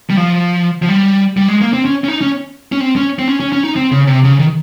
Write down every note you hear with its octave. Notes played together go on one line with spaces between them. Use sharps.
G3
F3
F3
G3
G3
G#3
A#3
C4
C#4
C#4
D#4
C#4
C#4
C4
C#4
C4
C#4
C#4
C#4
D#4
C4
C#3
C3
C#3
D#3